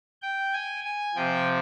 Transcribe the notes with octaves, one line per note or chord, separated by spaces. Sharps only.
G5
G#5
G#5
C3 F3 G5